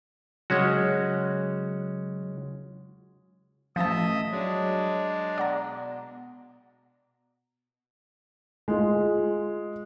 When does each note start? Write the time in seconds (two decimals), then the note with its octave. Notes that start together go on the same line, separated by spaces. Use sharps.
0.50 C#3 F#3 G#3 C#4 F#4
3.76 A1 F3 D#5 E5 A5 D#6
4.32 F#3 G#3 D4
5.38 B2 D5 F#5 A#5
8.68 G#3 F4